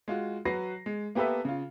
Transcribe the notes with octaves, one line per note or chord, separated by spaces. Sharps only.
G#3 F4 F#4
F#3 F#4 B4 A#6 C7
G#3
A#3 B3 G4 A4 B4 E5
C#3 F4